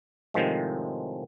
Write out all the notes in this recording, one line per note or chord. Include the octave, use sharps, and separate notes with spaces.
A2 C3 D#3 F3 G#3